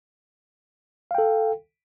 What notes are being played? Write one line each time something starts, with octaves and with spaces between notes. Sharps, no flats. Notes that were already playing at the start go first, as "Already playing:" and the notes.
A4 F5 G5